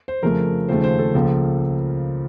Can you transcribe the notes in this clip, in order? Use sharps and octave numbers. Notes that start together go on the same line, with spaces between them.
C5
F2 C#3 F3 A3 A#4
D#2 C#3 F3 A3 C5
C5
A4
C#2 C#3 F3 A#3